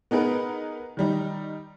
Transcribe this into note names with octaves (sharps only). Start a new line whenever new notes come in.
B3 D#4 G#4 A#4 B4
D#3 G3 D#4